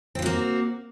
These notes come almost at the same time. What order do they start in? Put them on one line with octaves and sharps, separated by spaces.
C4 F4 F#4 A#3